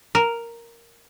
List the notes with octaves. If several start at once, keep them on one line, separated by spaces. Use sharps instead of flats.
A#4